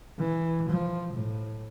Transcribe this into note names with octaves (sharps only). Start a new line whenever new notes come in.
E3
F3
A2